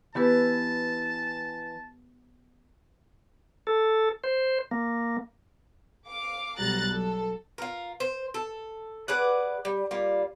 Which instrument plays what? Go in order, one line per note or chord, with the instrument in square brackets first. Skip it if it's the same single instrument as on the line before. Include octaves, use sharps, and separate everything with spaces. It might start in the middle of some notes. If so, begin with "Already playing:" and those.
[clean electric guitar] E3 [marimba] B3 G4 B4 [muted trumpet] A5
[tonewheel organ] A4
C5
A#3
[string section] F5 D6
B1 F#3 G3 A#5 F#6 A6
F#3 A4
[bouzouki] F4 A#4
C5
A4
G#4 B4 D5 F#5
G3
G3 A#3 F4